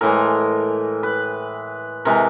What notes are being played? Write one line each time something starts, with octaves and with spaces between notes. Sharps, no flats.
A2 E3 G#3 A#4
B4
C3 E3 G#3 A#4